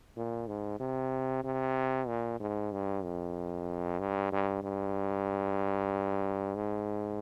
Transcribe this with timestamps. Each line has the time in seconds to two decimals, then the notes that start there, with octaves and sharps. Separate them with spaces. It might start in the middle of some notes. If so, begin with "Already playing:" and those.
0.17 A#2
0.48 G#2
0.80 C3
1.44 C3
2.07 A#2
2.40 G#2
2.72 G2
3.04 F2
3.99 G2
4.32 G2
4.63 G2
6.55 G#2